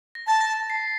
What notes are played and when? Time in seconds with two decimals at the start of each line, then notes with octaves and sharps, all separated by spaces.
0.15 A#6
0.27 A5 A6
0.41 A#6
0.70 C7